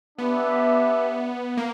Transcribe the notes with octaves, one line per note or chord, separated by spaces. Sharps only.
B3 D4 G4 B4 E5
A#3